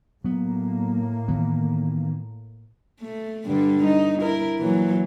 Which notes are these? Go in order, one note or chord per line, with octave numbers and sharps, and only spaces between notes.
A2 F#3 A#3 B3
D#3 E3 B3
A3
G2 D3 G3
D#4
E4 A#4
A#2 E3 F#3